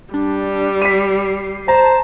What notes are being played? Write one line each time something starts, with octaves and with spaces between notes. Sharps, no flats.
G3 D4
B6 C7 D#7
C5 A5 A#5